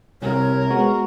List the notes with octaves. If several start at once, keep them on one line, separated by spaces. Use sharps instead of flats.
C2 C3 A#4 C#5
G#3 B3 F#4